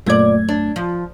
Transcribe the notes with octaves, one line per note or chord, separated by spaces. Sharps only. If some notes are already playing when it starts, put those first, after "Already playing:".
F#2 A#2 A3 D5 G#6
D4
F3